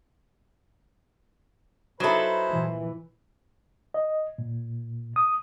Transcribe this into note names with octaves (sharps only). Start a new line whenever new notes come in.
F#3 D#4 E4 G#4 A4 B4 C5
A#2 E3
D#5
A#2
D#6